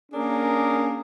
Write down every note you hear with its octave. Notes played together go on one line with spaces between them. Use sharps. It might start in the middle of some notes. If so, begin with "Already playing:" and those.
A#3 C#4 D4 G#4 A#4